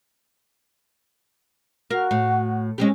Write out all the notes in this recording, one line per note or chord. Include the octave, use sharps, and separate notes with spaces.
F#4 A#4 F5
A2
G#3 C4 C#4 G4